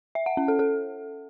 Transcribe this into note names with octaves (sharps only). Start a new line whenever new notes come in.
E5
F#5
C#4
A4
A4